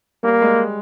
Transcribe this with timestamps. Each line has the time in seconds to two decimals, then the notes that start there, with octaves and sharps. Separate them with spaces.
0.23 G3 A#3
0.42 G#3